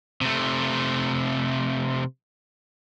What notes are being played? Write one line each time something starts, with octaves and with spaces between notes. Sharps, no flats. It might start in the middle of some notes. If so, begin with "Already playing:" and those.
C3 A3